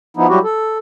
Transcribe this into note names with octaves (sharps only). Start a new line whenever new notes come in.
F3 B3 D#4 E4
F#3 G3 E4 F#4 G4
A4